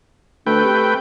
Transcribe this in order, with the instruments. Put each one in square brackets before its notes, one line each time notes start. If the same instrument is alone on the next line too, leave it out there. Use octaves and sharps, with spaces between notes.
[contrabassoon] D2 [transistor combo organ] A3 B4 G5
[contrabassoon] C3